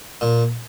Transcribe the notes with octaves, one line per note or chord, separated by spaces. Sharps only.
A#2